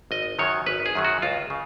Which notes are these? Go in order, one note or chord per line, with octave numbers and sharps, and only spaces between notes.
G#1 D#5
F#2 D#3 F#3 C#5
G#1 B4
G#4
F#2 D#3 F#3
F#4
C#2 F4
C#3